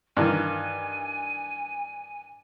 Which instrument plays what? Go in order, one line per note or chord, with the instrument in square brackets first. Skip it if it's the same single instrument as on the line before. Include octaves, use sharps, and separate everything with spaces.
[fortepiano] G2 D#3 E3 [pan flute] G#5